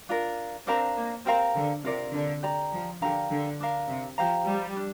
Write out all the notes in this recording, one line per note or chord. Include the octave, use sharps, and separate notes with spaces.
D4 F4 A#4
C4 D4 A#4 F5 A#5
A#3
C4 G4 A#4 F5 A#5
D3
C3 F4 A#4 D5
D3
G4 D5 A#5
F3
D3 G4 A#4 F5 A#5
D3
D4 A#4 F5
C3
F3 G4 C5 F5 A#5
G3
D4